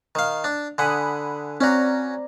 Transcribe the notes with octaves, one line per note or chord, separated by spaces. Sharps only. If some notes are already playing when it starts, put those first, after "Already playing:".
D#3 F5
D4
D3 F#5 G#5 B5 D#6
C4 C#4 F#4 D5 A#5